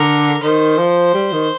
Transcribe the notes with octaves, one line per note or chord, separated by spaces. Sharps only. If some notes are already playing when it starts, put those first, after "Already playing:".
Already playing: D3 A#4
D#3 C5
F3
G3
D#3